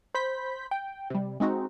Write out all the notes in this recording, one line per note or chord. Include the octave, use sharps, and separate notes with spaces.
C5 B5 G6 B6
G5
C3 G3
G#3 C4 D#4 F#4